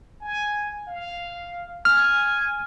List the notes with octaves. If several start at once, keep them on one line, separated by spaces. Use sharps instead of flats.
G#5
F5
G#5 F6